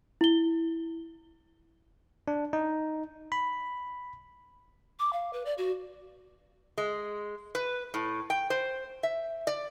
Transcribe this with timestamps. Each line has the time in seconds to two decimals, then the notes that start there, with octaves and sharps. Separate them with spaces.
0.21 E4 G7
2.28 D4
2.53 D#4
3.32 B5
4.99 D6
5.13 F5
5.33 B4
5.46 D5
5.58 F#4
6.78 G#3
7.55 B4
7.94 A2
8.30 G5
8.50 C5
9.03 E5
9.47 D5